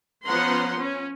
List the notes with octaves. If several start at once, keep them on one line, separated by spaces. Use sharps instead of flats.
F3 B3 C#4 F#5 A#5 C6
C#4